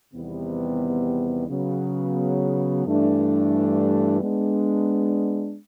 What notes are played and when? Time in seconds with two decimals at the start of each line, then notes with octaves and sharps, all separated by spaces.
0.13 E2 C3 D#3 G3 B3
1.48 C#3 F#3 B3
2.85 G2 E3 A3 D4
4.20 G#3 B3 D4